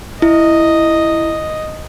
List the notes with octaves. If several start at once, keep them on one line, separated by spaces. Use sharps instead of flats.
E4 D#5